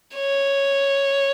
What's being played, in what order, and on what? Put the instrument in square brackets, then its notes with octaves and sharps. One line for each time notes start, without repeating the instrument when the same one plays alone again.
[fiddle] C#5